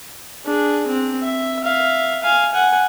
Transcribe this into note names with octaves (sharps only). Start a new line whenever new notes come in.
D4 G#4
C4
E5
E5 F5
F5 G#5
F#5 G#5